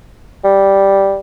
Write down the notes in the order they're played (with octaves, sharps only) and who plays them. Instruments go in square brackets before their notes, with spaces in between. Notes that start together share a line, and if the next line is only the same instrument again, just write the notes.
[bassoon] G3